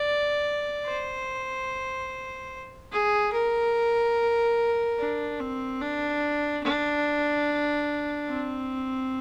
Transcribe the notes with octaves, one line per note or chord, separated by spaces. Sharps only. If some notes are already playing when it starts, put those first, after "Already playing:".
Already playing: D5
C5
G#4
A#4
D4
C4
D4
D4
C4